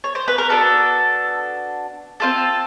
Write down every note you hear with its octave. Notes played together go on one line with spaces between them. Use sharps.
C#5
C5
B4
A#4
B3 D4 F#4 A4
C4 F4 A4